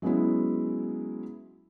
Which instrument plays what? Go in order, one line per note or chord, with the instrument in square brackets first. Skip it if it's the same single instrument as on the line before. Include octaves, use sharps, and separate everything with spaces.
[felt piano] F#3 G#3 B3 C#4 E4